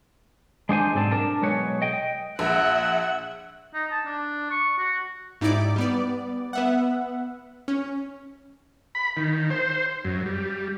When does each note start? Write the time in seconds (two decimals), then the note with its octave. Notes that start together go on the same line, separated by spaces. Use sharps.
0.69 G#3 D4 C5 G#5
0.94 B1 G#2 C4 D5 A5
1.11 D4 A#4 A5
1.42 B1 G#3 B4 C#5
1.82 D#5 G5
2.39 A#1 E5 F#5
3.74 D#4
3.92 A5
4.06 D4
4.51 C#6
4.79 F#4
5.41 G#2 D#4 E4 G4 D5 D6
5.76 G3 B3 D5
6.53 B3 E5 F#5
7.68 C#4
8.95 B5
9.17 D#3
9.50 C5
10.05 F#2
10.26 G3